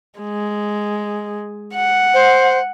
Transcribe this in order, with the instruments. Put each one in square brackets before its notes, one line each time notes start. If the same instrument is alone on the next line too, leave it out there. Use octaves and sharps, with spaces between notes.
[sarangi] G#3
F#5
[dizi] C5